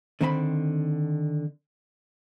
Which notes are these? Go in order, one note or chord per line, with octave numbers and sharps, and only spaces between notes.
D3 D#3 C4 C5 G#5 B5